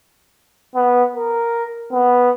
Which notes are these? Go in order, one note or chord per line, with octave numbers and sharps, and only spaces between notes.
B3
A#4
B3